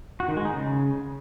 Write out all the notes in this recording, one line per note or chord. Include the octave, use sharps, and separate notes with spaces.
F#4
D#3
G#3
D#4
C#3